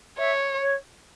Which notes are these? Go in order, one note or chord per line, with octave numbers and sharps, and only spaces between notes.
C#5 E5
C#5